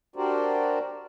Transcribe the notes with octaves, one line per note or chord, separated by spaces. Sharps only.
D4 F#4 G4 A#4 C5 D5